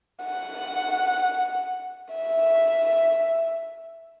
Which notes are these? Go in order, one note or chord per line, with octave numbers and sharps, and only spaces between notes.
F#5
E5